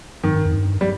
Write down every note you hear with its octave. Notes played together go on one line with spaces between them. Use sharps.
G2 D#3
G2
F2
G2
G3